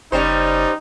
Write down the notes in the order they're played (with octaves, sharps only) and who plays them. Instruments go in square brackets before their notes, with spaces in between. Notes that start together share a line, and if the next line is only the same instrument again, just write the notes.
[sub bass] F#1 [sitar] G3 C#4 C5 [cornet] D#4